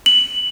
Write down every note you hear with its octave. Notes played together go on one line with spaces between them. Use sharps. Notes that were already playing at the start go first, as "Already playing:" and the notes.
F#7